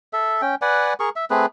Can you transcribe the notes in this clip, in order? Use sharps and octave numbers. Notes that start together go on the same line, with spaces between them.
A4 E5
C#4 G5
B4 D5 F#5 G#5
G#4 A#4 C#6
E5
A3 C4 G#4 B4